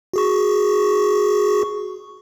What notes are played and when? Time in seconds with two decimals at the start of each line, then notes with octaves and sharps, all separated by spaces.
0.13 F#4 G#4 C#6